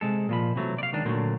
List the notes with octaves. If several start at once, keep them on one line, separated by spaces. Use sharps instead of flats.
C3 G#3 A4
A#2 F3 B5
C3 E3 F#3 A3
D5 F5
C#2 D#3 D4
A#2 D3 F#3 A3